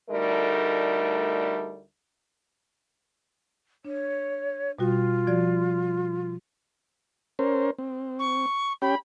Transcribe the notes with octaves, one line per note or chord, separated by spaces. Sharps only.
D2 G3 A3 D#4 A#4
D4 C#5
B2 G3 F4 F#4
F3 F#4 D5
C#4 A#4 C5
C4
C#6
C#4 G4 G5 B5